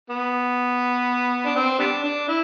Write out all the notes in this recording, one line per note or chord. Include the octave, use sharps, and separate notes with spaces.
B3
D4
C4
G3 B3 D4
D4
E4